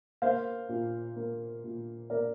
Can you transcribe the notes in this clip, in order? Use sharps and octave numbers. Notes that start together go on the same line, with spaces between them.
A#3 C5 F5
A#2
A#3
A#2
A#3 A#4 D5